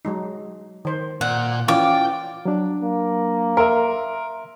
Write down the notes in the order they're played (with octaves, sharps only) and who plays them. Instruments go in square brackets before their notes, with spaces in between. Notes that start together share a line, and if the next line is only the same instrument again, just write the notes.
[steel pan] F#3 G#3 D#4
D#3 C5
[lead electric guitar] A#2 D5 [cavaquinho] F#5
[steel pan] E3 C#4 E4 [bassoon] F4 [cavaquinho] D5 D6 [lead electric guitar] G5
[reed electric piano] F#3 D4
[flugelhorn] A#3
[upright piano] A#4 [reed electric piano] E5 C6